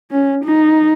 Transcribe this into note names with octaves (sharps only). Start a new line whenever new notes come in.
C#4
D#4